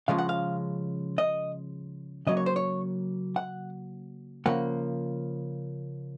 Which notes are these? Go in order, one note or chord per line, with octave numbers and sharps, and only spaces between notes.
C#3 F3 G#3 C#4 F5
F#5
F5
D#5
C#3 F#3 A#3 D#5
C#5
C5
C#5
F#5
C#3 F3 A#3 F#5